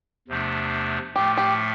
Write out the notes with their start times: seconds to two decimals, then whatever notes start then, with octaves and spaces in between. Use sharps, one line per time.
0.28 E2 C3 F3 A3 D4
1.15 A2 F3 A3 G4
1.37 G4